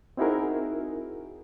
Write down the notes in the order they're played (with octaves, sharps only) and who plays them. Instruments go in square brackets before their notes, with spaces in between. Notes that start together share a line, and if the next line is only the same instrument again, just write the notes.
[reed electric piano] C4 D#4 E4 F#4 G#4 A#4